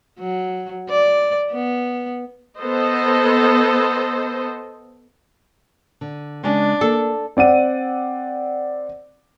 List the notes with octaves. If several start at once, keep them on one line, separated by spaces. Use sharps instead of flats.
F#3
D5
B3
B3 A4 C5 D#5
D3
C#3 G#3 D4
A#3 A4
C4 D5 F#5 D#7